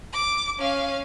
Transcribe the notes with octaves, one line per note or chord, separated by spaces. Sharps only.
D6
C#4 F5